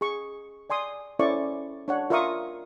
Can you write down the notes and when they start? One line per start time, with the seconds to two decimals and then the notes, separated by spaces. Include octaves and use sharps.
0.01 G#4 C#6
0.70 D5 G#5 C6 D#6
1.19 C#4 E4 A4 C5 D5 C#6
1.88 D4 C#5 F#5
2.10 F4 A#4 E5 F5 C#6 D#6